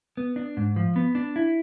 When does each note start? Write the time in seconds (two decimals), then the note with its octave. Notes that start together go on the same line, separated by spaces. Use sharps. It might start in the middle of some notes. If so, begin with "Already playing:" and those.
0.17 B3
0.36 D4
0.57 G#2
0.76 F3
0.96 B3
1.15 D4
1.36 E4